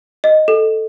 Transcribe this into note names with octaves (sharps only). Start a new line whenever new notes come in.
D#5
A4